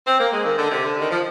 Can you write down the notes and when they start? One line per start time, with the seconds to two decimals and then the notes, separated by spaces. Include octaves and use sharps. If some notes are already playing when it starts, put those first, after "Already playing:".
0.07 C4
0.19 A#3
0.32 G#3
0.45 D#3
0.58 D3
0.71 C3
0.84 D3
1.00 D#3
1.11 F3